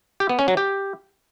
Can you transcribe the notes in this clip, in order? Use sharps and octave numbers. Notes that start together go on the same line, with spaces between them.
G4
B3
C#4
F#3
G4